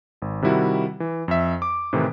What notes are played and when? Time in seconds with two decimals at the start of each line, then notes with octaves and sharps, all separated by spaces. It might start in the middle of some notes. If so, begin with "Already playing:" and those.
0.22 G#1
0.42 C3 D#3 G3 E4 F#4
1.00 E3
1.28 F2 E5
1.62 D6
1.93 A2 C3 D#3 E3